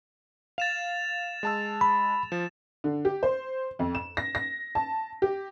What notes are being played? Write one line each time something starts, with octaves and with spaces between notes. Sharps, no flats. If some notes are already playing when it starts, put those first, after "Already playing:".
F5 A6 E7 F7
G#3 A5 E6
B5
F3 E7
D3
G4
C5
F2
E7
A#6
A#6
A5
G4